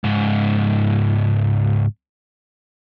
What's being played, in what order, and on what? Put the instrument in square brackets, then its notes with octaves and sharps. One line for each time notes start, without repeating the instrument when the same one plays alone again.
[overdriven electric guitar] C#2 G#2